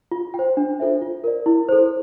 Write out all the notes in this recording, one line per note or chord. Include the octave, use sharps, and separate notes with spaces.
F4
G5
C5
D4
F4 A4 C5 E5
F4
A#4 D5
E4
A4 C5